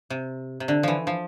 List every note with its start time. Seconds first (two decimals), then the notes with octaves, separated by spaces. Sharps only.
0.10 C3
0.60 C3
0.68 D3
0.83 E3 F3
1.07 F3